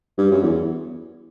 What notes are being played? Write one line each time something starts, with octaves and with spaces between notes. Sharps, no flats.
G2
F#2
E2